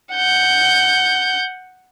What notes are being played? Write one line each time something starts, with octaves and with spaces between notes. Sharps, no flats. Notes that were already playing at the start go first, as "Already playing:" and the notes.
F#5 G6